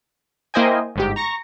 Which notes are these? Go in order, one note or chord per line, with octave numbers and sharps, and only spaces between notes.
A#3 E4 C5 D#5 G5 G#5
G1 G#2 G4
A#5 C#6 A#6 C#7